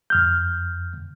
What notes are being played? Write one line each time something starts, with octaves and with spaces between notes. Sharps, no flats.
F2 F6 G6